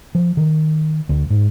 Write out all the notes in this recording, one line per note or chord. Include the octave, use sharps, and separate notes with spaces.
F3
D#3
D2
G#2